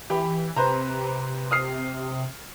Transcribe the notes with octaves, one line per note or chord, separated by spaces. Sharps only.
E3 G4 B5
C3 B4 C5 A#5
D#6 F6 C7